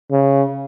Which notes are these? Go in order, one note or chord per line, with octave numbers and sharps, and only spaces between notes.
C#3